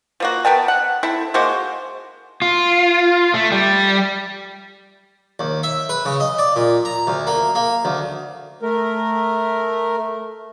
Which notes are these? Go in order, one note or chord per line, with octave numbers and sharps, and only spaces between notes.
F3 A#3 F#4
B3 A#4 G5 A5
F#5
C4 E4 A4
G#3 A#3 F#4 C5
F4
A3
G3
D#2
E5
B4
C#3
D#5
D5
A#2
A#5
D2
A#3
A#3
D2
A3 A#4